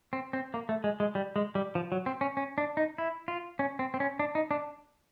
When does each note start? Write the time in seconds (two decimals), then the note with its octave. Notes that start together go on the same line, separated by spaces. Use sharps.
0.13 C4
0.33 C4
0.54 A#3
0.69 A3
0.84 G#3
1.00 G#3
1.15 G3
1.36 G#3
1.55 G3
1.75 F3
1.92 F#3
2.06 C4
2.21 C#4
2.37 C#4
2.58 D4
2.77 D#4
2.98 E4
3.28 F4
3.59 C#4
3.79 C4
3.94 C4
4.00 C#4
4.19 D4
4.35 D#4
4.51 D4